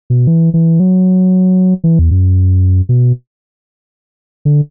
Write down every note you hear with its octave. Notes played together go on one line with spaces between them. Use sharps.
B2
E3
E3
F#3
E3
E2
F#2
B2
D3